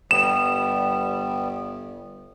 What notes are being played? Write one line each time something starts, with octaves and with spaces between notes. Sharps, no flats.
G1 G3 B3 E7